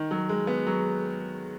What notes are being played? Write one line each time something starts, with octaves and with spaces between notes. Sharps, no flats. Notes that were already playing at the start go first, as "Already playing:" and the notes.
Already playing: D#3
F#3
G#3
B3
F#3